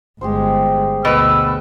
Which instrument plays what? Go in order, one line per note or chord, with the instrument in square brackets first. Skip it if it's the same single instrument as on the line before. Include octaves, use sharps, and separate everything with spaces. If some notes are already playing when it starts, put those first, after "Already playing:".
[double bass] G1 G#3 [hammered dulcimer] G4 G#4 C5
[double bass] D2 [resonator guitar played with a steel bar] B2 B4 [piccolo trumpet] E6